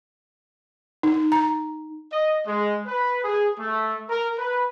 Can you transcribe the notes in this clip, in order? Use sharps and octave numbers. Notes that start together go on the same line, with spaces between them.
D#4
A#5
D#5
G#3
B4
G#4
A3
A#4
B4